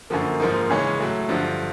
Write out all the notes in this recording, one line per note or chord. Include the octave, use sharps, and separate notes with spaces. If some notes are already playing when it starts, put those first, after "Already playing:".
F#2 D3 F3 A#3
G#2 F3 A#3 D#4
C#3 E3 G#3 C#4
A2 F#3 A3
G2 D3 F3